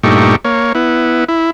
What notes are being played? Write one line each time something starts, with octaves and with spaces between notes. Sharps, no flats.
G2 A#2 A3 D#4 G4 C#6
A#3 C#5
B3 E4
E4